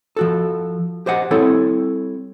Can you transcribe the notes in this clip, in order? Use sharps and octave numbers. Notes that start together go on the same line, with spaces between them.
F3 F#4 A4
G4 C5 D#5 F#5
G3 C4 E4 A4 C#5 G#5